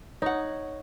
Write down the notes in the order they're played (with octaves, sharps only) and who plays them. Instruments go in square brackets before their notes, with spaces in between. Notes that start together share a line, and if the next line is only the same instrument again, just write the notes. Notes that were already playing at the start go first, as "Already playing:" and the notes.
[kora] D#4 F#5 [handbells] C#5